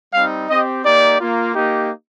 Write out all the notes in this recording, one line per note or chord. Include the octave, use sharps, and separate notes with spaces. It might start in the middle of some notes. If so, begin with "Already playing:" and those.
G3 C4 D#4 F5
C4 G4 D#5
A#3 D#4 G4 D5
A#3 F4
A#3 D#4 G4